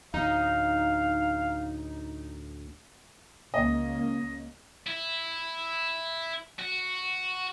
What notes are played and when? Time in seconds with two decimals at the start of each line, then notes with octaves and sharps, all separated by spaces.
0.14 D2 A2 D#4 F5
3.54 C#2 A#3 C#4 D#5
4.86 E4
6.59 F#4